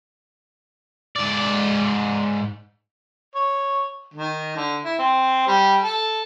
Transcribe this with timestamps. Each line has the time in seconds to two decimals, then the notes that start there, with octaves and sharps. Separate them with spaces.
1.16 G#2 D5
3.35 C#5
4.14 D#3
4.56 D3
4.85 E4
4.99 C4
5.47 G3
5.82 A4